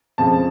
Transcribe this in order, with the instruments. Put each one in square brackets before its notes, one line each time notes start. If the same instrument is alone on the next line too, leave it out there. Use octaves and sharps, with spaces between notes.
[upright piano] F2 C#3 F3 G#3 A5